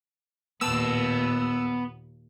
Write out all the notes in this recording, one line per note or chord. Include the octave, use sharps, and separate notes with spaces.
D#2 A#2 B3 A5 E6